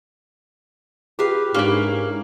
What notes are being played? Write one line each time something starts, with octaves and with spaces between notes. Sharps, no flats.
F4 G4 G#4 B4 F5
G#2 A#3 C#4 D4 E4 G4 C#5